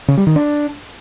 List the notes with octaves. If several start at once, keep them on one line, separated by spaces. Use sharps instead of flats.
C#3
G3
D#3
D4